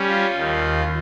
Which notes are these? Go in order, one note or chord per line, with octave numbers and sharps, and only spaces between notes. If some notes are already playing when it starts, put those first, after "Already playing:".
Already playing: G3 C#4
F4
D#2 D#3